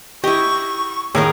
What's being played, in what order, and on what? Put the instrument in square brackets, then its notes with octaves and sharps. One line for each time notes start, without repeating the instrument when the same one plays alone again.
[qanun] E4 D#5 [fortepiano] G4 [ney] C#6
[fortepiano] D#2 A2 [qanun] G#4 A#4 D#5